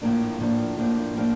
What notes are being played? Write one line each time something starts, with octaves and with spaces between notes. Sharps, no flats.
A2 F3 A#3 D4
A2 F3 A#3 D4
A2 F3 A#3 D4
A2 F3 A#3 D4